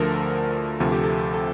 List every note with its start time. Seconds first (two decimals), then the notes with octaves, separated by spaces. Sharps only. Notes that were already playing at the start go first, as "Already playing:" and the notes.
Already playing: D2 D3 F3 A3 A4 A#4
0.80 D2 C3 F3 A3 A4
0.92 G4
1.04 A4
1.34 A4